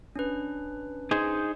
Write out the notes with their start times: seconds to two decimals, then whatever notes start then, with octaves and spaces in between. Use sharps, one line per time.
0.16 C#4 D4 B4
1.11 D#4 G#4 C5